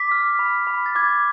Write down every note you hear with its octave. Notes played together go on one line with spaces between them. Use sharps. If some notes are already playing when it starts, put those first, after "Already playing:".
Already playing: D6 B6
F6
B5
B5
A6
D6 G#6